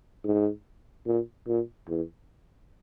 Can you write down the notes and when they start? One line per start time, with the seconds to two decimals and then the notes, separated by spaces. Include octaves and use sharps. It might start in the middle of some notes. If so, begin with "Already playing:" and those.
0.24 G#2
1.07 A#2
1.47 A#2
1.88 E2